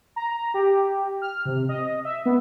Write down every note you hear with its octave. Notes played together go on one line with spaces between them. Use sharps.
A#5
G4
F6
C3
D#5
E5
B3